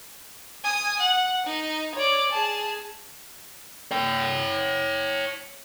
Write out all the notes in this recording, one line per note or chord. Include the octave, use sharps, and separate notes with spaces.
G#5 D#6
F#5
D#4
C#5 D5
G#4 A5
C#5 G5